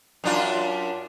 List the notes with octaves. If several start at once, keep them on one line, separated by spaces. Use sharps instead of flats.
F#2 D4 F4